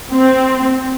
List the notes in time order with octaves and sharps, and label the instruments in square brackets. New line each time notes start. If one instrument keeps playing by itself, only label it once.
[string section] C4